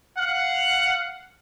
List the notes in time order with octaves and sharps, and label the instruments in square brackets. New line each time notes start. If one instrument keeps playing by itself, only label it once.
[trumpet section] F5 F#5